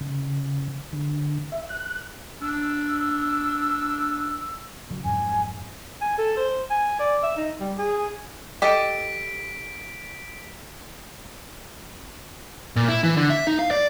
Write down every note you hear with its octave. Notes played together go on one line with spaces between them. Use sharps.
C#3
D3
E5
F#6
D4 E6
C#3 F#3
F2 G#2 F#3 G#5
G#5
A4
C5
G#5
D5
E5
D#4
G3
G#4
G4 A4 D#5 B6 D7
A#2
E4
E3
D3
E5
D#4
F5
D5